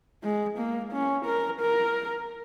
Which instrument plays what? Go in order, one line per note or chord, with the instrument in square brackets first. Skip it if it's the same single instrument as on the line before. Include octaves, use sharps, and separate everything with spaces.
[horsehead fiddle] G#3
A#3
C#4
A#4
A#4